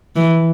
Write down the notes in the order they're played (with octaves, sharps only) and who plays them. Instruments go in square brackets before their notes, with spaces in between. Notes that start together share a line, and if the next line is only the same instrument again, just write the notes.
[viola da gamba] E3